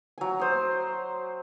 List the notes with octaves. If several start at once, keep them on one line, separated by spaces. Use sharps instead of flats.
F#3 G#5
C5 D#6